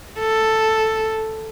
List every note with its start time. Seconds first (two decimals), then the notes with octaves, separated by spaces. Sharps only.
0.19 A4